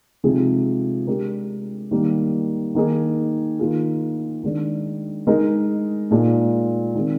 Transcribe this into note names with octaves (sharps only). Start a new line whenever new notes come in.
C3 F3 G#3 D#4 G#4
G#3 D4 G4 A#4
D#3 G3 A#3
D#3 A#3 D#4 G#4
D#3 A#3 F4 G#4
D#3 G#3 D4
G#3 D#4 A#4
A#2 G#3 D#4
D#3 G#3 C4